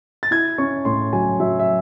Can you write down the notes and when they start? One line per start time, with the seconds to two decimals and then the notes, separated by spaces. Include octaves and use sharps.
0.23 A6
0.31 E4 G#6
0.58 C#4 C#6
0.85 A2 C6
1.13 F#3 G#5
1.40 F#3 E5
1.59 E5